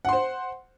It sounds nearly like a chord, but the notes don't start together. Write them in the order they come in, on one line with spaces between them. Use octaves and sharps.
F#5 C6 C5